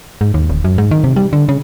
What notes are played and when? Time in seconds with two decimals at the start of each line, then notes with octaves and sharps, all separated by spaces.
0.21 G#2
0.34 D#2
0.49 D1
0.64 F#2
0.78 G#2
0.91 D#3
1.04 C3
1.16 G3
1.33 D3
1.49 C#3